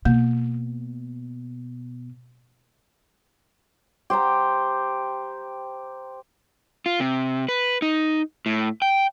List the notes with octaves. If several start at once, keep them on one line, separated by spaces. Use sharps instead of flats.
B2 A#3
G4 C5 G5 A#5
F4
C3
B4
D#4
A2
G5